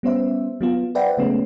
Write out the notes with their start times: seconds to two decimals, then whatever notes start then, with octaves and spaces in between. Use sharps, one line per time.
0.03 G3 B3 C#4 C5 E5
0.61 F#3 B3 F4
0.95 B4 C5 D5 E5 F#5 G5
1.17 C#3 F#3 G#3 A3 B3 C#4